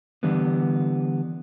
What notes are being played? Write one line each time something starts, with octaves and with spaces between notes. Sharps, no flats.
D3 E3 G3 B3